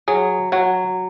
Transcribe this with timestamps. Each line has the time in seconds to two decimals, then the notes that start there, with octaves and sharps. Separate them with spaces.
0.08 F#3 G#4
0.52 F#3 F#4